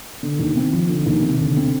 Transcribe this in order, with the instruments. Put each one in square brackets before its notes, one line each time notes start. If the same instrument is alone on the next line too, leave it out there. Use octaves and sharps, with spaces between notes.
[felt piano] D3
D#2
C4
F3
D3
D#2
C3
D2
C4